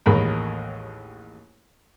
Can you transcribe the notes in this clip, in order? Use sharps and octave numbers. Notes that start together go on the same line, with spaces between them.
A1 D#2 G#3 A#4 B5